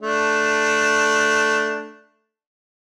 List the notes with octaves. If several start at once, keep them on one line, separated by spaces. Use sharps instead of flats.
A3 D4